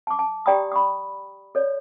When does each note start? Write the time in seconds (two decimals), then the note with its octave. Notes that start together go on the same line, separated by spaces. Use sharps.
0.07 A5 D6
0.19 A5
0.46 G4 D5 G5 A#5 B5 D#6
0.72 B5 C#6 D#6
1.55 A4 C#5 D5